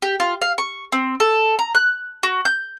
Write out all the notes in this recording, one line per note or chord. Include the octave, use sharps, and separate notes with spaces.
G4
F4
F5
C#6
C4
A4
A#5
F#6
F#4
G6